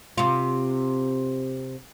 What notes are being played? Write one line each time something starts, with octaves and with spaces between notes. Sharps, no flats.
C3 F4